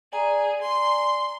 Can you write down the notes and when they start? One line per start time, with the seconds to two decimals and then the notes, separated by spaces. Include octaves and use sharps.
0.13 G#4 D5 G#5 A#5
0.62 C6